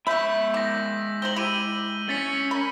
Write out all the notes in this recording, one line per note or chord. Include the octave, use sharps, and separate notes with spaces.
G#3 E5 B5 C#6 E6 G6 B6
D#3 D6 A#6
C4 D#4 C5 F#7 G7
E4 G4 E6 D#7
C#4 A6 B6 C#7
A#4 B5